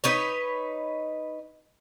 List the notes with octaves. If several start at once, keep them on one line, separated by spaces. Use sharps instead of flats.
D#4 B4 C#5